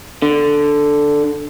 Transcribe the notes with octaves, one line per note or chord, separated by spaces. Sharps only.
D3